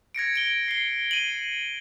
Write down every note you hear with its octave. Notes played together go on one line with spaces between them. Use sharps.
G#6 A#6 C#7 D7
D7 G7
C7 G7
D#7 F#7